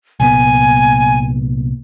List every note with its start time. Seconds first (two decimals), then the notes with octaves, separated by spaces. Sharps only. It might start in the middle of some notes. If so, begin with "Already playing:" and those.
0.20 C2 A#2 B3 G#5